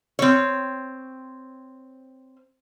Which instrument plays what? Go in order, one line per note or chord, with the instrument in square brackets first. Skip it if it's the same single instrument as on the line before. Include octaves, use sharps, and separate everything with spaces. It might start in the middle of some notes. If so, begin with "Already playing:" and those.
[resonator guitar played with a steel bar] C4 C#5